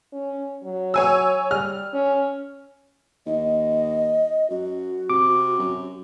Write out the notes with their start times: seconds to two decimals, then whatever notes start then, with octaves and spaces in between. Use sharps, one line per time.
0.12 C#4
0.64 F#3
0.94 C#5 G#5 E6
1.51 G3 F6
1.93 C#4
3.26 D#2 D#5
4.50 F#2 F#4
5.10 C3 D6
5.59 F#2